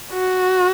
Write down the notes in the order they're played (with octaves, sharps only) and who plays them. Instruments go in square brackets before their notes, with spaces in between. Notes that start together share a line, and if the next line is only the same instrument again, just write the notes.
[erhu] F#4